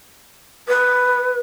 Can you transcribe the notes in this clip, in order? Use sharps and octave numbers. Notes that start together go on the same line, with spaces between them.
B4